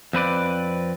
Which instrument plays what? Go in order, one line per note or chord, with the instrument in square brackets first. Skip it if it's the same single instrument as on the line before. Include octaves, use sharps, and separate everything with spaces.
[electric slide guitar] F2 C4 B4 D5